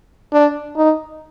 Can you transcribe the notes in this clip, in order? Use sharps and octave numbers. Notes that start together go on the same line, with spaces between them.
D4
D#4